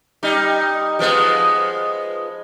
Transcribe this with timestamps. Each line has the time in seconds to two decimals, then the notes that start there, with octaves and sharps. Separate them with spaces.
0.23 G3 D#4
0.99 F3 G#3 B3